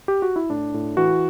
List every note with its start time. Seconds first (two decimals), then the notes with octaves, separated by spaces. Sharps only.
0.08 G4
0.22 F#4
0.36 E4
0.50 A2 D4
0.74 A2
0.97 E3 F#4